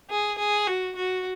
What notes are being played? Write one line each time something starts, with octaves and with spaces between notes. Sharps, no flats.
G#4
G#4
F#4
F#4